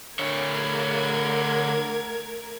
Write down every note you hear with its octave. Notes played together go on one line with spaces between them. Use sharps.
D3 A3 A#4 C#5 G#6